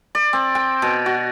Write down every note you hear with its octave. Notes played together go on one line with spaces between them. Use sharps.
D5
C4
G5
B2
F#4